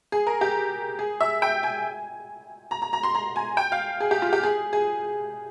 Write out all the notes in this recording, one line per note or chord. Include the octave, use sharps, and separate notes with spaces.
G#4
A#4
G4
G#4
E5
G5
G#5
A#5
A#5
A#5
C6
A#5
G#5
G5
F5
G#4
G4
F4
G4
G#4
G#4